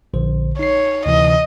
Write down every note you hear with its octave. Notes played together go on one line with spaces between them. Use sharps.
A#1 D3 C5
D#4 C#5 C7
D2 C3 E3 D#5